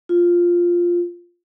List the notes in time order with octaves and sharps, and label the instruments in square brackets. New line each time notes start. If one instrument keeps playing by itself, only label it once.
[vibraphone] F4